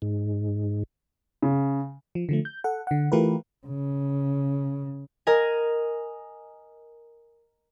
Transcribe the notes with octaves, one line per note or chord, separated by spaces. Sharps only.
G#2
C#3
F3
D3 F3 A3
G6
A4 F#5
D3 F#5
E3 A3 F4 G4 A#4 B4
C#3
A#4 D#5 G#5